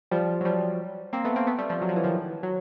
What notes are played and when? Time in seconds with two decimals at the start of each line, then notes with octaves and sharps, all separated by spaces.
0.11 F3 G3
0.41 F#3
0.45 F3 G3
1.13 A#3 C4
1.25 A3 B3
1.36 A#3 C4
1.47 A3 B3
1.58 G3 A3
1.69 F3 G3
1.82 F#3
1.89 F3
1.96 E3
2.04 D#3 F3
2.43 F#3